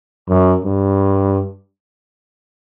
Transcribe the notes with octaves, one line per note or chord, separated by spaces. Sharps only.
F#2
G2